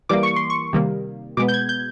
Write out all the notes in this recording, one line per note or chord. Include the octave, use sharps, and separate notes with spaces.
E3 G3 A#3 D6
C#6
C6
C#6
C3 D#3 G3 A#3
B2 G#3 B3 D6
G6
G#6
G6